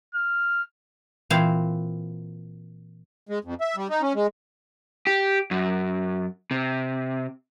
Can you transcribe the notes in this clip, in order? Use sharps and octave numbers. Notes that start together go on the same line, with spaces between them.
F6
A#2 E3 C4 C5 F5
G#3
F2
E5
G3
D#4
C#4
G#3
G4
F#2
C3